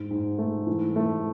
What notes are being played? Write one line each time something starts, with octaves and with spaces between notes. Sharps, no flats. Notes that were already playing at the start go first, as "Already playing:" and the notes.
Already playing: G#2
G#2
A3
E3
A3